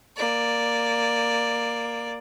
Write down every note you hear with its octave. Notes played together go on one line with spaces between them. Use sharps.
A#3 D5